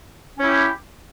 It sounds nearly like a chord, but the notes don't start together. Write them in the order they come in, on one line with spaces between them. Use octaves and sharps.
C#4 E4 G4